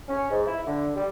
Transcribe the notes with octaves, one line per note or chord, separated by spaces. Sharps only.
C#4
G#2
E4
D3
G3